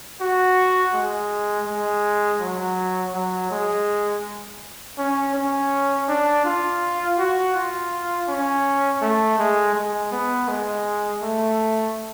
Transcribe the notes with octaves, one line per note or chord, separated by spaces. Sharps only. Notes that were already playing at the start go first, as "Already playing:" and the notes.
F#4
G#3
G#3
F#3
F#3
G#3
C#4
C#4
D4
F4
F#4
F4
C#4
A3
G#3
G#3
B3
G#3
A3